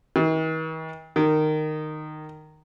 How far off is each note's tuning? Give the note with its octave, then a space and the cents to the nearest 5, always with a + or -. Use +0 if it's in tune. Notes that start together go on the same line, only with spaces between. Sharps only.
D#3 +45
D#3 -15